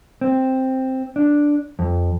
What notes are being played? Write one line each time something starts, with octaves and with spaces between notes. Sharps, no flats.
C4
D4
F2